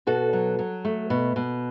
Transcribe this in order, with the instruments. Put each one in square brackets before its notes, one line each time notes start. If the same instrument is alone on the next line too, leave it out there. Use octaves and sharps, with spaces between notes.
[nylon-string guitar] B2 F#4 A4
F#3
F#3
A3
B2
B2